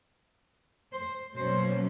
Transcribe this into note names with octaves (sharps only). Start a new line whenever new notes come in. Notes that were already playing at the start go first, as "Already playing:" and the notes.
C5
B2 F#3 A#3 C#4 C5